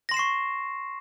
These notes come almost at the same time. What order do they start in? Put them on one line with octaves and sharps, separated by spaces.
A#6 C6 E7 C7 C#6